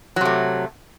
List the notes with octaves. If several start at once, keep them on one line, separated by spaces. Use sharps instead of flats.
C3 F#3 A3